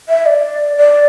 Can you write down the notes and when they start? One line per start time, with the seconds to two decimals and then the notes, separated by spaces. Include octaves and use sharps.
0.09 E5
0.26 D5
0.77 D5